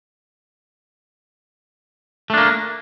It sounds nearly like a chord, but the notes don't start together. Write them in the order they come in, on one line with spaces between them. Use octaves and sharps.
A3 D4 A#3